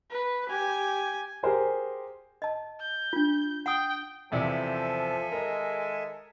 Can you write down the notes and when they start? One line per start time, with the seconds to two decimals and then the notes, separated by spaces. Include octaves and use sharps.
0.11 B4
0.50 G4 G#5
1.43 G4 G#4 A#4 C5 G#5
2.42 D#5 A5
2.81 G6
3.13 D4 F4
3.66 F#5 G5 D#6
4.32 E2 C3 F3 A4 D5 E5 G#5
5.32 D#3 G#3 A#4